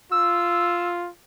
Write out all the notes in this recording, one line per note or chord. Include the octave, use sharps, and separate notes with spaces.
F4 E6